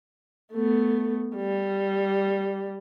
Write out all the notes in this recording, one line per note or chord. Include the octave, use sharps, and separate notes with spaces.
A3 B3
G3